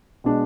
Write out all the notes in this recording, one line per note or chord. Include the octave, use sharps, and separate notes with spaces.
B2 G#3 D4